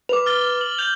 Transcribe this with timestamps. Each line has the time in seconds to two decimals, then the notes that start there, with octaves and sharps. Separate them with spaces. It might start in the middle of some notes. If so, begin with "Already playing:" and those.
0.09 B4 D6 F7
0.26 F6 A6 G7
0.61 F#7
0.78 G6 F7